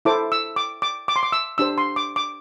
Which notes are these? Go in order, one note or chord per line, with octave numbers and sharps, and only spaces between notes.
E4 A4 C5 D6
E6
D6
D6
D6
C6
D6
E6
D4 G4 C5 E6
C6
D6
D6